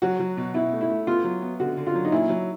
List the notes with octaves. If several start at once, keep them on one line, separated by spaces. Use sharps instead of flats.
F#3 F#4
F#3
B2
B2 E4
A3
E4
A3
B3 F4
F#3
B3
D3 F#4
D3
F4
F#3
D#4
A#2 E4
F#3